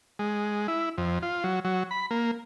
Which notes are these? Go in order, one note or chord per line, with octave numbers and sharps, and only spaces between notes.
G#3
E4
F2
F4
F#3
F#3
B5
A#3